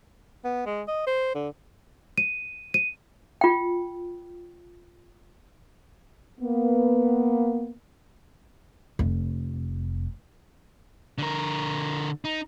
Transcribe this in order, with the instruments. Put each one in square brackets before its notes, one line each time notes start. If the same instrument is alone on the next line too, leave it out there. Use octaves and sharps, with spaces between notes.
[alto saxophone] B3
G#3
D#5
C5
D3
[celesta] D#7
D#7
[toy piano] F4 G5
[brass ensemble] A#3 B3
[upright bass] F1
[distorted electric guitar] D3 A#4
D#4